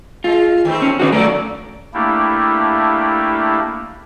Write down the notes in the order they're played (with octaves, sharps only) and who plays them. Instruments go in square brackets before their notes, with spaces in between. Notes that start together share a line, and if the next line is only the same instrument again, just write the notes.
[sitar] G#3 [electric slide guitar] F4
[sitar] D#3 A3 C4
[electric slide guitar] C#4
[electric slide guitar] D#3 D#4 F#4 [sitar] A3 B3 D4
[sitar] F2 F#3 D5 [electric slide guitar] A3 A#4
[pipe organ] A3 A#3 D4 E4 G4